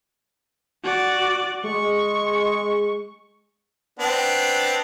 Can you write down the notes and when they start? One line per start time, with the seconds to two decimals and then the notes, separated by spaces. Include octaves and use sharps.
0.84 F#4 D5
1.64 G#3 C#6
3.99 B3 C4 D4